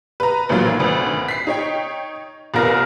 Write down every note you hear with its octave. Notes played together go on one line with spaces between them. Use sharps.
B4 A#5
A1 D2 A#2 D#3 F#3 F5
G#1 D2 B4
B6 C7
D#4 C#5 G5
F1 B1 B3 F4 A#4 A#6